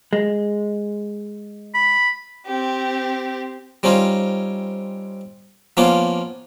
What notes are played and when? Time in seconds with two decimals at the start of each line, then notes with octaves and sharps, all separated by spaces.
0.13 G#3
1.74 B5
2.46 C4 G4
3.83 G3 C4 C#4 D#4 F4
5.77 F3 A#3 B3 C#4 F4 D5